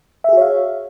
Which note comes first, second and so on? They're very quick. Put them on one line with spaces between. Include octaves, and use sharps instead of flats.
E5 G#4 F#4 C#5 F5